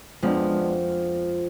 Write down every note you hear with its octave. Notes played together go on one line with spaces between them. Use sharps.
F2 F3 G#3 B3 D4